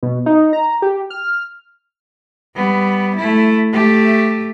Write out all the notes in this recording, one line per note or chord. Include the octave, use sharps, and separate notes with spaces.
B2
D#4
A#5
G4
F6
G3 B3
A3 E4
A3 G4